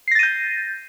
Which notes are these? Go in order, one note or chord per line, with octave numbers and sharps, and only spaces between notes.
G6 A6 A#6 C7 D#7